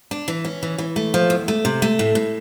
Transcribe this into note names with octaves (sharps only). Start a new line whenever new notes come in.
D4
E3
C#4
E3
E3
A3
F3
E2
A3
C3
A3
A2
A2